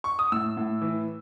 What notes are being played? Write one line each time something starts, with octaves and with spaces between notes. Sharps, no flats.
C#6
D#6
A2 E6
A2
E3